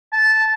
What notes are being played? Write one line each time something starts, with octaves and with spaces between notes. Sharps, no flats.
A5